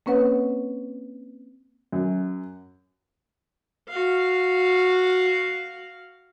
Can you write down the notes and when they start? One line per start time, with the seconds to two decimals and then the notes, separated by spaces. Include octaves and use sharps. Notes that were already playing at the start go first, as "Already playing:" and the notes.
0.06 A#3 C4 C#4 B4 C#5 F#5
1.92 F#2
3.89 F#4 F5